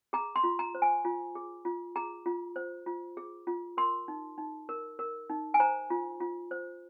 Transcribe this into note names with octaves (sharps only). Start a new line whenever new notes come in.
G#4 A#5
C6
F4
A#5
C5
G#5
F4
G#4
F4
G#4 A#5
F4
C5
F4
G#4
F4
A#4 C6
D#4
D#4
A#4
A#4
D#4
G#5
C5 A#5
F4
F4
C5